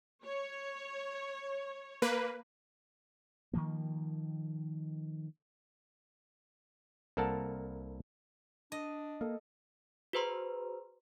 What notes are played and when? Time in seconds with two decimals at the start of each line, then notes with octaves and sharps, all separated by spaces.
0.25 C#5
2.02 A#3 B4
3.53 D#3 F3 A#3
7.17 C2 A#3 A4 A#4 F#5 A5
8.72 D4 D#5
9.21 A#3 A4 D#5
10.13 F#4 G#4 B4 C5 A#5 C6